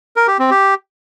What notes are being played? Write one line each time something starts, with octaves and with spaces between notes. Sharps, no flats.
A#4
G4
C4
G4